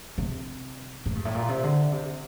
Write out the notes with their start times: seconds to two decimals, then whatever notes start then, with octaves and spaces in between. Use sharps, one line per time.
0.18 C3
1.06 A2
1.15 G2
1.25 A2
1.35 A#2
1.48 C3
1.64 D3
1.92 C3